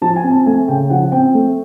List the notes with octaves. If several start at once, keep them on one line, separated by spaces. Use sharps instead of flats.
F3 A5
G#5
C4
A5
A3 G#5
C#3 G5
F3 F#5
C4 G5
A3